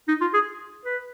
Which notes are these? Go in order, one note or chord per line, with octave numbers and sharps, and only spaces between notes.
D#4
F4
G#4
B4